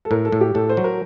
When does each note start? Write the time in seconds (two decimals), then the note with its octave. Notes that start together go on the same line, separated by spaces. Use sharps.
0.05 A4
0.11 A2 A#4
0.25 A4
0.32 A2
0.41 G4
0.55 A2 A4
0.69 C5
0.77 F#3
0.84 A#4